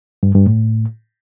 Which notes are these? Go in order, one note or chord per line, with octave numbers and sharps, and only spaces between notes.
G2
G2
A2